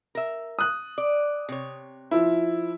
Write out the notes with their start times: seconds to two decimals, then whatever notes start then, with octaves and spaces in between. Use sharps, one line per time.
0.15 A#4 E5
0.59 D#6 F#6
0.98 D5
1.49 C3 C#5
2.11 F3 E4